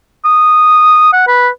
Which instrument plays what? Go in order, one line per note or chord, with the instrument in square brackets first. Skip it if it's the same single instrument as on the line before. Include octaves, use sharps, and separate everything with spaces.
[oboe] D#6
F#5
B4